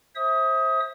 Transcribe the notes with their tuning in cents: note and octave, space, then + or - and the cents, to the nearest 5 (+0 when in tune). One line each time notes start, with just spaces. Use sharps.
C5 +25 E5 -20 D#6 +20